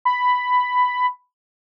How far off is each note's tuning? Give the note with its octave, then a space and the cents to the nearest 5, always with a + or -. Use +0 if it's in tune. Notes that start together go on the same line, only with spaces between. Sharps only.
B5 +5